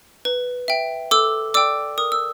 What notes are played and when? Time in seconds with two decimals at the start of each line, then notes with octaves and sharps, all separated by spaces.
0.25 B4
0.68 E5 G5
1.11 A4 D6 E6
1.54 D5 G5 D6 E6
1.98 A#4 D#6
2.12 E6